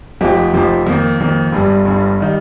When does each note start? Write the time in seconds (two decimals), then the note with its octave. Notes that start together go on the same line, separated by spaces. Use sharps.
0.21 F1 F2 F3 D#4 G4
0.54 F1 F2 F3 D#4 G4
0.87 F2 D#3 A#3
1.20 F2 D#3 A#3
1.53 G1 G2 G3
1.85 G1 G2 G3
2.20 D#3 G3 D#4